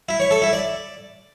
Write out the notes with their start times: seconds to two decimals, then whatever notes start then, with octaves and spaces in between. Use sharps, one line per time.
0.09 E4
0.20 C#5
0.31 A4
0.42 E4
0.53 D5